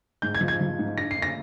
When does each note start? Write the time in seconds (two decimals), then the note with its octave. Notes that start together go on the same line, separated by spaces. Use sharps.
0.22 G#2 G6
0.35 G#6
0.41 F3
0.48 G#6
0.61 F3
0.79 G#2
0.98 D4 A#6
1.11 C7
1.16 D3
1.22 A#6